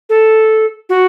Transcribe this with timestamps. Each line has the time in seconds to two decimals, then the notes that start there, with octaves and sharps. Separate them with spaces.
0.09 A4
0.89 F#4